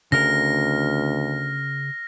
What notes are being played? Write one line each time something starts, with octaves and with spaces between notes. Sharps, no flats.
D2 C#3 A#4 F6 A#6